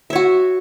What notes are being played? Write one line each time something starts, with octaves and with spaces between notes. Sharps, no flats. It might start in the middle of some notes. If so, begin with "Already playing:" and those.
F#4 C#5 E5